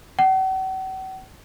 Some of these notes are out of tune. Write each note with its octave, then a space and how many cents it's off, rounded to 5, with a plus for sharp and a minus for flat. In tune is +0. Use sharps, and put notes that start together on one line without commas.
F#5 +45